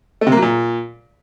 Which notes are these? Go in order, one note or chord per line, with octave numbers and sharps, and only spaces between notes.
A3
C3
A#3
F#3
A#2